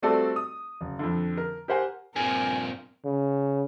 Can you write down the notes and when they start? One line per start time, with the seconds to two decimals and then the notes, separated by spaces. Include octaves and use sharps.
0.02 G3 A3 C4 F#4 A4 D5
0.36 D#6
0.81 F#1
0.99 F2 D3
1.37 A#4
1.68 G4 A#4 C5 F#5 G#5
2.16 G2 A#2 C4 A#4 G#5
3.05 C#3